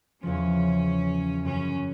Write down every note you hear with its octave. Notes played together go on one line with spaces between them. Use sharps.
E2 C#3 F3 C#4
F#2 C#3 F#3 C#4